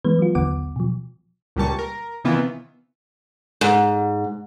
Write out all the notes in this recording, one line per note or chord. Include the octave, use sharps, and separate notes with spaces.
E3 G#3 B3 B4
F#3 F4
A1 D#2 D3 B3 F#5 D6
B2 F3
C#2 A#2 G3 A5 C#6
A#4
C3 D#3 E3 B3 F4
G#2